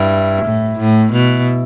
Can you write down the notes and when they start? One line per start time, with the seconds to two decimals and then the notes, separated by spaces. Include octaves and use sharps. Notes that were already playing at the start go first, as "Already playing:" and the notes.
Already playing: G2 E4
0.45 A2
0.79 A2
1.12 B2